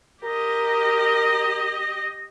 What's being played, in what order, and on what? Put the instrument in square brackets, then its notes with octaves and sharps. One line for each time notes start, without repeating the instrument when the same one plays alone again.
[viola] G4 D#5 [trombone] A#4 [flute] A#6